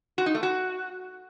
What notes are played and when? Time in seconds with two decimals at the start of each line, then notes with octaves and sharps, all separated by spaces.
0.18 F#4
0.26 D#4
0.34 A3
0.43 F#4